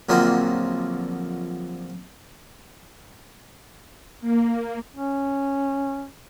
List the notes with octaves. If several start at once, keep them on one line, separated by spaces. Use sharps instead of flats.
A#1 D3 F3 F#3 A#3 C4
A#3
C#4